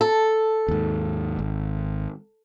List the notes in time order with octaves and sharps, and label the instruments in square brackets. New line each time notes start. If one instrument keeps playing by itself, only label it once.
[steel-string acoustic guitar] A4
[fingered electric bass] D#2 G#2
G#1